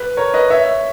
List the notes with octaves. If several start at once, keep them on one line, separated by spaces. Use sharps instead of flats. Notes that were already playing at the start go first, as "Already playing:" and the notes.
Already playing: B4
A#4 C#5
B4 D#5
C#5 E5